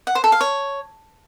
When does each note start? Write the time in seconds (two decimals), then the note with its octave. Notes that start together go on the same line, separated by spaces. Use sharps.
0.07 F#5
0.15 C5
0.24 A4
0.32 F5
0.41 C#5